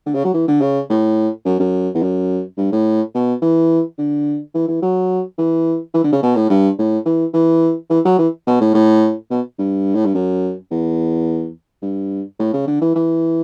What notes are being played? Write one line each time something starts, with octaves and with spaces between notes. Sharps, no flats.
D3
C#3
F#3
E3
D3
C#3
A2
F#2
F#2
E2
F#2
G2
A2
B2
E3
D3
E3
E3
F#3
E3
E3
D3
C#3
B2
A2
G2
A2
E3
E3
E3
F#3
E3
B2
A2
A2
B2
G2
A2
G2
F#2
E2
G2
A2
C#3
D3
E3
E3